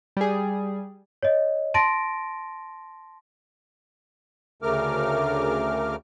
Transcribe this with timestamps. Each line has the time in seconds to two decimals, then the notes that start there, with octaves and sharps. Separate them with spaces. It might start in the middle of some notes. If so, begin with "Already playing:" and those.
0.17 G3 G#4
1.23 C#5 D#5
1.74 A5 C6 A6 A#6 D7
4.62 D2 C#3 A3 A#4 D6 F6